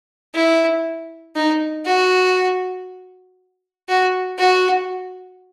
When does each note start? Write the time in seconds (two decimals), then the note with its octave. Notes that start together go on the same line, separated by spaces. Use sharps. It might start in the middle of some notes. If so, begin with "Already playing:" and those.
0.35 E4
1.36 D#4
1.85 F#4
3.89 F#4
4.38 F#4